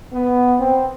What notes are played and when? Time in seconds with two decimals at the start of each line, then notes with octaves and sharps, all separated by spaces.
0.13 B3
0.60 C4